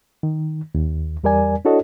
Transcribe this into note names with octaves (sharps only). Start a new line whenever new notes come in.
D#3
D#2
E2 G3 A#4 D5 G#5
D4 E4 F#4 A4 C#5 D#5